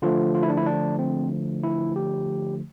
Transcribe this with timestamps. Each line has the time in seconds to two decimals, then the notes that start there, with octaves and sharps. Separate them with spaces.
0.02 D3 F3 A3 F4
0.35 F4
0.43 E4
0.50 D4
0.57 E4
0.66 D4
0.99 C4
1.63 E4
1.96 G4